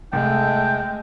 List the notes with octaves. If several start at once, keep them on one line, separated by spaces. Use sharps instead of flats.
C2 G#3 A3 G5